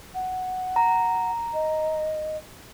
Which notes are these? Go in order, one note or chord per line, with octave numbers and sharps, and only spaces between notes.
F#5
A#5
D#5